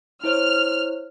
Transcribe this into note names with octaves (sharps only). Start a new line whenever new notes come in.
E4 C5 C#5 F6